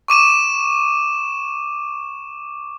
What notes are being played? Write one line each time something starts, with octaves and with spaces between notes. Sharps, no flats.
C#6 D6 D#7 E7